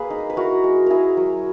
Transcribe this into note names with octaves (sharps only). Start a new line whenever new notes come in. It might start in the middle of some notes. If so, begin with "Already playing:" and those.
Already playing: A#3 G#4 B4
D#4
B4
E4 F#4 A#4
G#3
E4 G#4 A#4
F#3